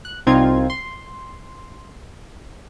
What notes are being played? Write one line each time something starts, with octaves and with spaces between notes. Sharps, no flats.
F#6
C2 C4 D#4 F4 G#6
C6